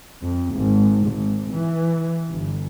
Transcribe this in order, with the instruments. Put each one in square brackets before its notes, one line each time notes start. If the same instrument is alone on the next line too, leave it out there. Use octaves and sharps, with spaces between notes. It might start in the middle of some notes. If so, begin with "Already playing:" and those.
[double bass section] F2
G#1
G#1
E3
G1